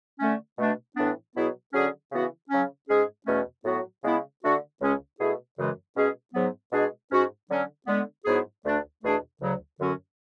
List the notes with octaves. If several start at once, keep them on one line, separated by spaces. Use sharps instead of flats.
D3 A3 C#4
B2 A3 D4
A2 E3 B3 D4
B2 F#3 B3 E4 G#4
D3 F#3 C#4 G#4
C#3 E3 B3 F#4
C#3 F#3 C#4
G#2 G#3 C#4 G#4
E2 B2 A3 C#4
A2 F#3 B3 F#4
C#3 G#3 B3 E4
D3 A3 D4 F#4
C#2 C#3 G#3 C#4 G#4
B2 A3 E4 G#4
F#2 C#3 E3 G#3
B2 G#3 C#4 G#4
G#2 F#3 B3
B2 G#3 D4 G#4
G#2 G#3 C#4 F#4
D3 F#3 C#4
D3 G#3 B3
G#2 F#3 B3 E4 G#4
D2 D3 A3 D4
E2 B2 A3 D4 G#4
D2 C#3 F#3
F#2 D3 F#3 C#4 F#4